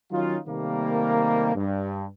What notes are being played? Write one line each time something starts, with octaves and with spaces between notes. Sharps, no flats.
D#3 F#3 C#4 D#4 F4
C3 D#3 G3 A3 A#3
G2